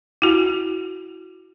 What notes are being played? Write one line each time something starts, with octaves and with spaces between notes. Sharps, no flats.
E4 F#4